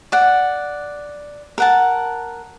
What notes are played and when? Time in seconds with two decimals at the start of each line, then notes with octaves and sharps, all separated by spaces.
0.12 D5 F#5
1.58 A#4 F#5 A5